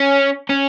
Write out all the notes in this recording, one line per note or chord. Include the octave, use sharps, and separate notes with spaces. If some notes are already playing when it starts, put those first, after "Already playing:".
Already playing: C#4
C#4